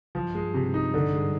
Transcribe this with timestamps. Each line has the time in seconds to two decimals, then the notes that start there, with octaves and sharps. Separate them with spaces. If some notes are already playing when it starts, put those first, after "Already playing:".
0.15 G2 F3
0.35 G#3
0.54 C3
0.74 D#4
0.93 G#2 D3
1.13 G#3